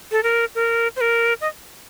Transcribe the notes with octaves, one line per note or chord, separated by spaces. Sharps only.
A4
A#4
A#4
C5
A#4
D#5